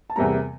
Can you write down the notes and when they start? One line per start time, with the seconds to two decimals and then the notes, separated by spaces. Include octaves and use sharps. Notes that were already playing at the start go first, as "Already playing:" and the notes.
0.10 A5
0.16 E2 C3 G3 A#3 A#5